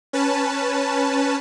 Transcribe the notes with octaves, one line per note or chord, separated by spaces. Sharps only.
C#4 B4 A5